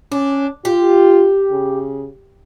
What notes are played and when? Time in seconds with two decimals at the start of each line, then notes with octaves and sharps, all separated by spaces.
0.12 C#4 D4
0.65 F4 G4
1.51 C#3